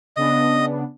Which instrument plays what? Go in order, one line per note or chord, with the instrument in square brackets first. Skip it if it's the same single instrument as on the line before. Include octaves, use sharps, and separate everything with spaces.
[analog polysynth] C#3 B3 D4 [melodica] D#5